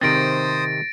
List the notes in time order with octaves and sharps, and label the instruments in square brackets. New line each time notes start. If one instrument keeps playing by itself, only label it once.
[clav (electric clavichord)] C3 D#3 C4 [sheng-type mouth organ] C5 D#6 [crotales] A6 A#6 D7